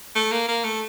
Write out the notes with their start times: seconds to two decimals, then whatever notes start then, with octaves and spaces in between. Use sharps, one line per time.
0.16 A3
0.32 A#3
0.48 A#3
0.64 A3